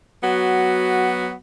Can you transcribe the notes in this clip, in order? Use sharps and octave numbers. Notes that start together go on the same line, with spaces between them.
F#3 B3 F#4